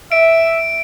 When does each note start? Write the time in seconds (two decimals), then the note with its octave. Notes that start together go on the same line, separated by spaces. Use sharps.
0.12 E5 D7